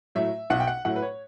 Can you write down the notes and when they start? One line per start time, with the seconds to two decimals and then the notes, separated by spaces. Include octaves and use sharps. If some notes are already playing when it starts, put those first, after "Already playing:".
0.15 A2 F#3 A3 E5
0.50 B1 F#5
0.60 G5
0.67 F#5
0.85 A2 F#3 A3 F#5
0.96 B4
1.02 C#5